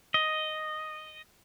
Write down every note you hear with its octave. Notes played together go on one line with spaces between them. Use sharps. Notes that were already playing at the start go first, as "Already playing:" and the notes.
D#5